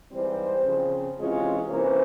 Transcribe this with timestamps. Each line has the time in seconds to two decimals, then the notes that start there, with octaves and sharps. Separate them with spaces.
0.11 G#2 E3 G3 C4 C5
0.64 C#3 F3 C4
1.18 C3 E3 G#3 C#4 F4
1.71 C3 E3 A#3 C#4 C5